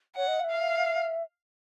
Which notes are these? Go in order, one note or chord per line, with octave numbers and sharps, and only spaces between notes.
C#5 F#5
D#5
F5
E5
F5